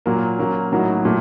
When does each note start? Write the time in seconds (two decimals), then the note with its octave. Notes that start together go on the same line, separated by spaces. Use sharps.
0.06 A#2 F#3 A#3
0.39 F#3 A#3 C#4
0.72 A2 F#3 A#3 D#4 F#4
1.05 A#2 F#3 A3